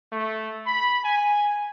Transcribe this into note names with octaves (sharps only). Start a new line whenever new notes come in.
A3
B5
G#5